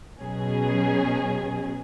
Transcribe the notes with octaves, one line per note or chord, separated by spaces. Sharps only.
B2 F#3 C#4 G#4